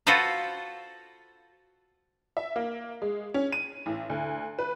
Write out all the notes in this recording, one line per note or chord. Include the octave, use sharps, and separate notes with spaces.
F4 F#4 A4 B4 C5 F5
E5
A#3
G#3
C#4
D#7
A1
D2
B4